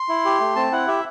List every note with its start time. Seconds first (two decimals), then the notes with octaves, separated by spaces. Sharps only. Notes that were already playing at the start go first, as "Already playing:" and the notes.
Already playing: C6
0.09 E4
0.25 G4
0.40 A3
0.56 C4 A5
0.72 E4 F#5
0.88 G4 E5